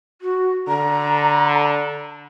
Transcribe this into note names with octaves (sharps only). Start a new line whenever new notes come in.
F#4
D3 A#5